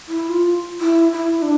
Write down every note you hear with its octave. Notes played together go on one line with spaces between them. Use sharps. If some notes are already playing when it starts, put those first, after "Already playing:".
E4
F4
E4
E4
D4